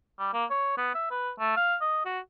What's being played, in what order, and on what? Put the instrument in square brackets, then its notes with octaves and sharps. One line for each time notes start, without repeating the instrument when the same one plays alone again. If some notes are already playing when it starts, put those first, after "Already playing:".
[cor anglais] G3
A#3
C#5
B3
E5
B4
A3
F5
D#5
F#4